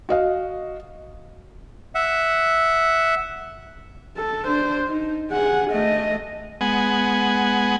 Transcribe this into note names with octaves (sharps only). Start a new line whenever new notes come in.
F#4 D#5 F5
E5 F#5
A4
D4 C5
D#4
G#4 F#5
A3 D#5
G#3 B3 F#5 G#5